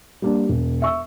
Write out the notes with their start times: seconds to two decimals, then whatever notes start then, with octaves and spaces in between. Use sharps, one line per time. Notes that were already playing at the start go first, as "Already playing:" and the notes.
0.22 G3 A#3 D4
0.49 E1
0.82 E5 C#6 E6